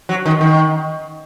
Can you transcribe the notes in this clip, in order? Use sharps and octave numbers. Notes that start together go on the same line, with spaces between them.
F#3
D#3
D#3